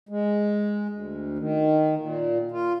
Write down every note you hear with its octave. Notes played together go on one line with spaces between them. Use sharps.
G#3
D2
D#3
A#2
F4